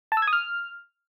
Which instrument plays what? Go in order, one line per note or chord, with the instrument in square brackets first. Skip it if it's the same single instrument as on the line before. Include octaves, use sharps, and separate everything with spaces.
[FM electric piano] A5
E6
G#6
D#6
F6